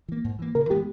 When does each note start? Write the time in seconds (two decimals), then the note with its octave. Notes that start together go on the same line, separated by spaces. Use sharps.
0.08 E3 A#3
0.24 G#2
0.39 E3 A#3
0.55 C#3 A#4
0.70 E3 G#3 B3 G4